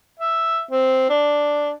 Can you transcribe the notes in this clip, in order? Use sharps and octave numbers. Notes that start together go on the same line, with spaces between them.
E5
C4
D4